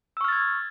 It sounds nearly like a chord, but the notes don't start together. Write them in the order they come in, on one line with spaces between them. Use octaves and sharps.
E6 C#6 F6 A6 G#6